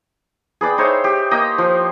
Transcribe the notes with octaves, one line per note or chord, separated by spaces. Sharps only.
G#4 B4 D5 G5
D#4 C5 C#5 E5
G4
A#3 D#5 G5
F3